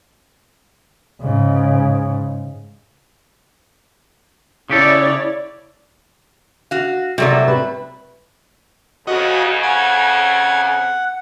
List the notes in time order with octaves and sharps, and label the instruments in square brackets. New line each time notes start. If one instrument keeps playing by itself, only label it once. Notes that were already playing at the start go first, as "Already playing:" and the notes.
[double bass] G#2 C#3
[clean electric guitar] C#3 G4 A4 [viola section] E4 C#5 D5
[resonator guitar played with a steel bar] F#4 F5
[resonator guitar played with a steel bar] C3 F#3 A3 [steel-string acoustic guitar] F#4 A#4 D5
[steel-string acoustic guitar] B4
[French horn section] F2 C#3 [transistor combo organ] F#4 D#5
[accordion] F#5 [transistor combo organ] G#5